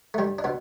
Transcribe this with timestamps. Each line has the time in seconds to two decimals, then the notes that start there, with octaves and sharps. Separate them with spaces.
0.14 A3
0.18 G2 G3
0.39 D4
0.44 B2 B3